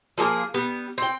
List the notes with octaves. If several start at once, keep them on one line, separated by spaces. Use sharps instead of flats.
F3 A#3 G#4 A#4
G3 B3
C4 G5